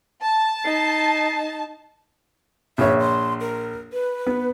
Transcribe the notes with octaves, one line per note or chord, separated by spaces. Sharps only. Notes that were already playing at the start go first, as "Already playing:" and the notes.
A5
D#4 C7
A#1 C#5 E5
C6
A#4
B4
B3